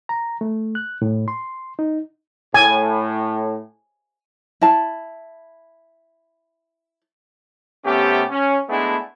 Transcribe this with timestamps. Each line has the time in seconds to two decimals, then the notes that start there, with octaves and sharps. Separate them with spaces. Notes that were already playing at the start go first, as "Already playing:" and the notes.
0.09 A#5
0.41 A3
0.75 F#6
1.02 A2
1.28 C6
1.79 D#4
2.54 A2 G#5
4.61 E4 A5
7.85 C3 A3 B3 C#4 G4
8.30 C#4
8.68 G#3 A3 B3 D4 E4 G#4